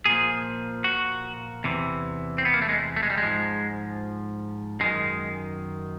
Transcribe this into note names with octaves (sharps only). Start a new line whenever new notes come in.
A#2 F3 G#4
F#4
E2 C3 E3
C4
B3
A#3
A3
G#3
A3
G#3
G3
G#3
G#2 F3
F#2 D#3 G#3